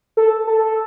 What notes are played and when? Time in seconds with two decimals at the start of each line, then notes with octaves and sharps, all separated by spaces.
0.17 A4
0.47 A4